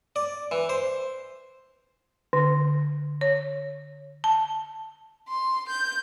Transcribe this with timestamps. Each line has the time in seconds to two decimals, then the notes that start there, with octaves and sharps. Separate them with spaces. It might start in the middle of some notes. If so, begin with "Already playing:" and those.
0.16 D5
0.51 E3
0.69 C5
2.33 D3
3.21 C#5
4.24 A5
5.28 C6
5.69 G6